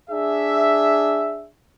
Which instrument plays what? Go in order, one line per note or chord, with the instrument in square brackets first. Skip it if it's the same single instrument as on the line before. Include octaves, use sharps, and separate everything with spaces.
[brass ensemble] D4 G#4 E5